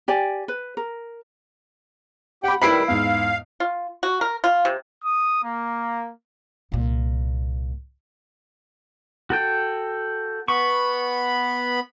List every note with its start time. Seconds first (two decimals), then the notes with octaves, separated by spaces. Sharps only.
0.08 G4 D5 G#5
0.48 B4
0.77 A#4
2.44 G4 F#5 G5 B5
2.62 D#3 G3 E4 B4 B5 C7 D7
2.88 E2 G#2 F5
3.60 F4
4.03 F#4
4.21 A#4
4.44 F4
4.65 C3
5.05 D#6
5.44 A#3
6.72 C2 A#2
9.30 F#4 A4 G5
10.48 B3 B5 C#6